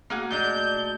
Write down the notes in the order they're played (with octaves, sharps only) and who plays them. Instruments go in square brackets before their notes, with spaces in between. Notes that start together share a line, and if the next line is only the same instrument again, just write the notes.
[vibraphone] A3 F#4 [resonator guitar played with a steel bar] A#3 G#4 F#5
[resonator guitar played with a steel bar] A#2 G#3 D4 [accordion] G6